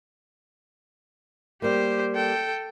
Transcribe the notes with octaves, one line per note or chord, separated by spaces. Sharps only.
G3 A#3 G4 C5
A4 G5